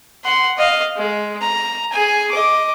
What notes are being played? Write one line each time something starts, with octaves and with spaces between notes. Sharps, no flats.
F#5 C6
D#5 F5
G#3
A#5
G#4 G#5
D#5 D6